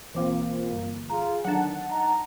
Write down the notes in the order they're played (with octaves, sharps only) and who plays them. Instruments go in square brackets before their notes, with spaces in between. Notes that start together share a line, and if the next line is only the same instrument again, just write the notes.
[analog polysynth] B1 C4 F4 [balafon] E3 D6 [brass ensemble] A#3
[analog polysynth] G1
[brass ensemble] F4 G#4 [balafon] A#5
[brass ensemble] E2 D3 D#3 [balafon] F#3 D4 [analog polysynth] F#5 A5
[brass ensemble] D#4 A#5